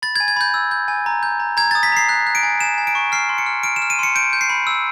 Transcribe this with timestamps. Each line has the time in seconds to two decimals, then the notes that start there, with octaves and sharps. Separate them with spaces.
0.02 B5 A6
0.16 G#6
0.20 G#5
0.28 G#6
0.36 B5 G6
0.54 E6
0.71 G6
0.88 G#5
1.06 A#5
1.23 G6
1.40 A#5
1.57 A#5 G#6
1.71 A6
1.75 D#6
1.83 B6
1.92 A#5 C7
2.09 F#6
2.26 F#6
2.35 D7
2.43 G#5
2.61 G#5 E7
2.78 G#5
2.87 D7
2.95 C#6
3.12 F6 C7
3.29 C6
3.38 C#7
3.46 F6
3.63 F6 D7
3.76 E7
3.82 F6
3.90 D#7
3.99 C6 C#7
4.15 G6 D7
4.33 G6
4.41 C7
4.49 B5
4.67 E6